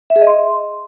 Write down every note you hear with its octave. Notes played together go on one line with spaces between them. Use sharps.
E5
G#4
D#5
C6